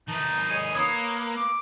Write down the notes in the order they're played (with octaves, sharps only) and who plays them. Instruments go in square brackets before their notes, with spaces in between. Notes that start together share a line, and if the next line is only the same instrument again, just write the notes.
[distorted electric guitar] D#3 B4 [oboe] D#4 [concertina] A5 A#5
[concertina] G#4 D#5 [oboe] C#5 [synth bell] D#7
[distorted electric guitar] A#3 [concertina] B4 E6 [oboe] C#5 [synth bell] D#6
[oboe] D6